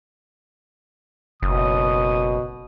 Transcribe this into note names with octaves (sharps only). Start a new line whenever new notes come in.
F#1 B2 D#6